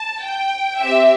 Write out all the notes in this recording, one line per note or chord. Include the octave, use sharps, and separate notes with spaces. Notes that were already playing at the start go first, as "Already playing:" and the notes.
Already playing: A5
G5
C4 G4 E5